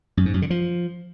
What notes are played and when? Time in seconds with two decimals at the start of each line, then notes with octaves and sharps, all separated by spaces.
0.17 F#2
0.26 G#2
0.34 F#2
0.42 D3
0.50 F3